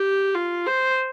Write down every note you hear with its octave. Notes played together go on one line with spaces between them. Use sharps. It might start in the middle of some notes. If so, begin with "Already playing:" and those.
Already playing: G4
F4
C5